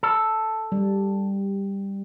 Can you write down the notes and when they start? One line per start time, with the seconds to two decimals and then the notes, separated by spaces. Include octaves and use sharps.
0.03 A4
0.72 G3